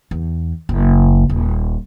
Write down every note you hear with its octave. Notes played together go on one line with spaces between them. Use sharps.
E2
F#1
D#1